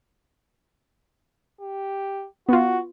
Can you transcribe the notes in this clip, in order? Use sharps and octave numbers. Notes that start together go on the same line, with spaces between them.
G4
B3 F4 F#4